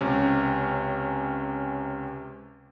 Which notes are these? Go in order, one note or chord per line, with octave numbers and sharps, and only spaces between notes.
C#2 C3 C#4